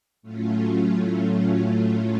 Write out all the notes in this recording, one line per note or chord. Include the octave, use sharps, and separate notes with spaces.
A2 F#3 A3 C#4 F4